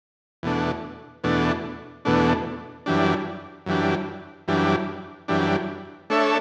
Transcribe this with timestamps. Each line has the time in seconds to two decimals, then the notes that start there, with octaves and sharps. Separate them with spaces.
0.43 E2 B2 A3 D4
1.24 E2 B2 A3 D4
2.05 E2 B2 A3 D4
2.86 F#2 E3 G3 D4
3.66 F#2 E3 G3 D4
4.48 F#2 E3 G3 D4
5.28 F#2 E3 G3 D4
6.10 A3 D4 A4 C#5 E5